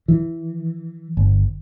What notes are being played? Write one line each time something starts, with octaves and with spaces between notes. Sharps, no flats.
E3
G1